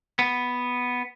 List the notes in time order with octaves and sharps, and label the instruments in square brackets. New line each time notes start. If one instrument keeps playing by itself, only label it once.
[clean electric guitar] B3